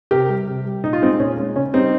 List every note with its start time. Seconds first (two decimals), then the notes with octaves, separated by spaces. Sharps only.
0.11 C3 G4 A#4
0.29 G3
0.47 C3
0.65 G3
0.83 A#2 D#4
0.93 F4
1.02 G#3 C4 D#4
1.20 A#2 C#4
1.38 G#3
1.56 C#3 C#4
1.73 G3 C4 D#4